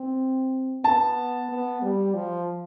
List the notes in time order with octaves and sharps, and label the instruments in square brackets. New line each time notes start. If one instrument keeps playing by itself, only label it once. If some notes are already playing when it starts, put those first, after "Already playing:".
Already playing: [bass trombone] C4
[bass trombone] B3 [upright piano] A5
[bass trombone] B3
G3
F3